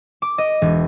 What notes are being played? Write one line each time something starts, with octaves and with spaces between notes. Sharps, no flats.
D6
D#5
E1